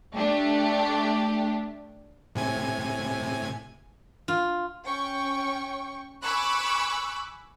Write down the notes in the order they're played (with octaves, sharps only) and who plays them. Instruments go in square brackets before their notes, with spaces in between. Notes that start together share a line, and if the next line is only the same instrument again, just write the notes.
[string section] A3 D4 G4
[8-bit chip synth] A2 C3 G#5
[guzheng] F4
[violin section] C#4 G5 C#6
G#5 B5 C#6 D6 E6 F#6